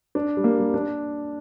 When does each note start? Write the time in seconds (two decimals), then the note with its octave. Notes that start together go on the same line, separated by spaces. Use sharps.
0.15 D4
0.37 G3
0.44 A#3
0.59 G3
0.74 D4